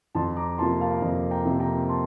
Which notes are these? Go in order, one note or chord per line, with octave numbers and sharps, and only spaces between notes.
F2 A5 C6
A#5 D6
C3 F3 A#3 A5 C6
F5 A5
F2
G5 A#5
C3 F3 A#3
G5 A#5
A5 C6